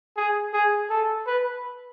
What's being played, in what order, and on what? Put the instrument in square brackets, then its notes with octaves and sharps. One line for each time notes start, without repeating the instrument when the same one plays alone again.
[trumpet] G#4
G#4
A4
B4